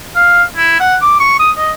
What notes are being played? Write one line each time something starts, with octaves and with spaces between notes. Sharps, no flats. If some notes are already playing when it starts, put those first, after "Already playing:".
F5
E4
F#5
D6
C#6
D#6
D#5